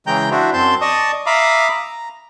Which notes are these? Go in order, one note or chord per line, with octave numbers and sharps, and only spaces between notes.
C#3 E3 G#3 G5 A#5 G6
D4 E4 F#4 C5
F#2 C4 A5 C6 G6
D5 D#5 A5 C#6 D#6
E5 F5 A#5 B5 D6 D#6
A#5